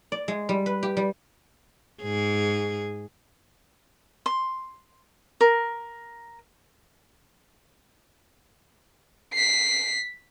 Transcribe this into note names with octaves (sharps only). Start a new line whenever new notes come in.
D5
G#3
G3
B4
G4
G3
G#2 G#4
C6
A#4
B6 C7